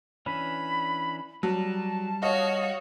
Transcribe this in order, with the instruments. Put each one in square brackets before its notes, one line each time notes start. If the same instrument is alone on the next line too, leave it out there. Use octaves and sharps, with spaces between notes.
[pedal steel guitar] E3 C#4 D4 [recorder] B5
[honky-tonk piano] F#3 [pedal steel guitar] G3 [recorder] A5
[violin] F#4 C#5 [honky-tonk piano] D#5 F5